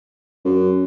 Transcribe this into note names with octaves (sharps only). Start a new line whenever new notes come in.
F#2